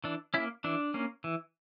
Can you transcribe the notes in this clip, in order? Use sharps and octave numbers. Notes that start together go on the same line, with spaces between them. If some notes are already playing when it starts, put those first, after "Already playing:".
E3 D4
A#3 C#4 E4
E3 D4
A#3 C#4
E3